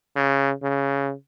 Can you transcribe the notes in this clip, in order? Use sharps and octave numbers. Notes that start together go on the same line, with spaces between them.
C#3
C#3